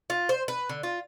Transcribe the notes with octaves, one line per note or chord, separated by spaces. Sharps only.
F4
C5
B4
D3
F4